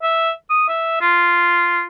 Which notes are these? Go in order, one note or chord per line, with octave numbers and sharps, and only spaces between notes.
E5
D#6
E5
F4